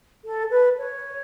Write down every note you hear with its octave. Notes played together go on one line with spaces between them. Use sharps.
A4
B4
C#5